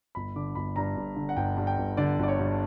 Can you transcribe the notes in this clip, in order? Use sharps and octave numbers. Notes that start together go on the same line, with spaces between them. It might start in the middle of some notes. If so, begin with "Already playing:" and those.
G1 B5
D3 D6
G1 B5
G2 A#5
G1
D3
F#5
G1 G5
G2
G5
G1
D3 D5
G1 D5
C#5
G2